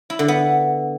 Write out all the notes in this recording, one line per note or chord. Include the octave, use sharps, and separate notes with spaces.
E4
D3
B3